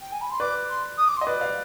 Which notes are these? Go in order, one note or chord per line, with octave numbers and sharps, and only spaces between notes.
G5
G#5
B5
C6
B4 D5 D6
C6
D#6
D6
C6
D#5
B4 D5
D5 F5